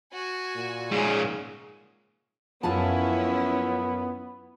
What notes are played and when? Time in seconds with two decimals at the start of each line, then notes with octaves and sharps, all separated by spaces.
0.13 F#4 G#5
0.55 A#2
0.91 G#2 C#3 G#4
2.63 F#2 F3 B3 C#4 E4 F4 G#4 A5